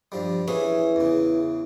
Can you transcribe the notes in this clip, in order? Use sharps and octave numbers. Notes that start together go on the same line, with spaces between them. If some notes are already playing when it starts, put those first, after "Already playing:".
G2 F3 G3
E3 C#4 G#4
E2 C#3